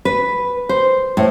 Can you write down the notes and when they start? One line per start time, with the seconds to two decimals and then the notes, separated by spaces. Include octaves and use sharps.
0.05 B4
0.69 C5
1.17 A2